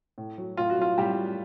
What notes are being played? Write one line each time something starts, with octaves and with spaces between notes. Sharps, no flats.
A2
F#3
A2 F4
F#4
F#3 F4
A2 G3 G4
F#3